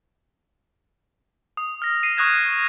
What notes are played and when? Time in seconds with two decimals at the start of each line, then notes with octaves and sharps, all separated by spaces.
1.57 D#6
1.82 F6 A#6
2.03 C7 D#7
2.17 C#6 D#6 F#6 G#6 A#6 E7